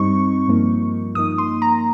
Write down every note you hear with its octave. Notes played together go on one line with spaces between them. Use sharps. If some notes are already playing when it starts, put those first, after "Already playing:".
Already playing: G2 G3 C4 D#4 C#6
G2 F3 A#3 D#4
G2 F3 A#3 D#4 D#6
C6
A#5